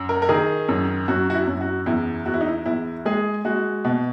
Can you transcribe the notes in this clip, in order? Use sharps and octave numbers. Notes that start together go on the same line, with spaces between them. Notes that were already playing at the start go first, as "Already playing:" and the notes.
Already playing: F#2
A#4
A#4
D#3 G#4
F#2
F#2 F#4
F#4
E4
F#2
F#4
E2 E4
E2 F#4
E4
D#4
E4
E2 E4
G#3 G#4
G#3 F#4
B2